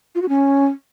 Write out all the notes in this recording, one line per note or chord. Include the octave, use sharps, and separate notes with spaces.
F4
F#4
C#4